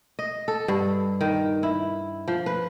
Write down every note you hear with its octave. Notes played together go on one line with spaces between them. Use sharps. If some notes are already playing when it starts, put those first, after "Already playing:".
D#5
A4
G2
D#3
E4
F3
B4